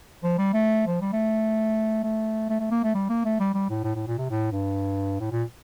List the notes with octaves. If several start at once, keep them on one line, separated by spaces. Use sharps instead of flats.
F3
G3
A3
F3
G3
A3
A3
A3
A3
A#3
A3
G3
A#3
A3
G3
G3
A2
A2
A2
A#2
C3
A2
G2
A2
A#2